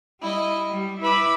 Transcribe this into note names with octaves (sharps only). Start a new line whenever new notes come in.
G3 E4 D#5
G3
E4 B4 E5 B5 D6 E6